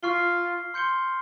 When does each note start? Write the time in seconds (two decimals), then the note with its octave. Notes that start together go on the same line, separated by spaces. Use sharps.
0.03 F4 C#6 F6 C7 G7
0.74 C6 G6 C#7 G7